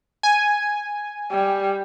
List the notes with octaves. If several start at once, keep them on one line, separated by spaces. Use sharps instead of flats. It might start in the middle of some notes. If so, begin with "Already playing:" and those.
G#5
G3